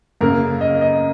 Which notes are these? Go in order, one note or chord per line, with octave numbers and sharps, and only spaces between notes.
F#2 C#3 A#3 A#4
D#5
D#5